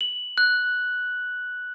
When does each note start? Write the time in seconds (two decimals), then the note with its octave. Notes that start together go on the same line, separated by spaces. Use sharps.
0.01 F#7
0.38 F#6